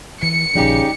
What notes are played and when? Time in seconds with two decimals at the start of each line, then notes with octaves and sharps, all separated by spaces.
0.23 E3 C#7
0.55 A#1 C#3 F3 G3 D#4 G4